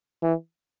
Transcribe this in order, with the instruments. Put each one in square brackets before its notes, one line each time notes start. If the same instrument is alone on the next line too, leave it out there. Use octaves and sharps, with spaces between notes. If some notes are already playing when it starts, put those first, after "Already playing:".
[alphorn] E3